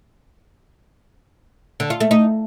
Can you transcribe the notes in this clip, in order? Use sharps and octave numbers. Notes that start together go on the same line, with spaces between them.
D3
F4
A3
D#4